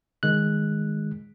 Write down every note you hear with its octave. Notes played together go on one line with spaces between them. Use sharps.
D#3 G#3 F#6